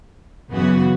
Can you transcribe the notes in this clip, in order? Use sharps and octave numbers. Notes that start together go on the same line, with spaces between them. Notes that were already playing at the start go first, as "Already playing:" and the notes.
F#2 C#3 E3 B3 F#4